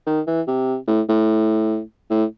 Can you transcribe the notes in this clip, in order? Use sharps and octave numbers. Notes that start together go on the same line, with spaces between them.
D#3
E3
C3
A2
A2
A2